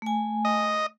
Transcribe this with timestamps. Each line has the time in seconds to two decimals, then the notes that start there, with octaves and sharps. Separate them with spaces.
0.02 A3 G#5
0.45 D#5